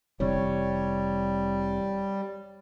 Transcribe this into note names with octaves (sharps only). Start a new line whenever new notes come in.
F1 C3 E3 G3 C#5